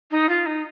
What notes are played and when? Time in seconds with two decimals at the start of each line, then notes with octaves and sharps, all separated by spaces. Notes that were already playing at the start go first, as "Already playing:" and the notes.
0.11 D#4
0.29 F4
0.46 D#4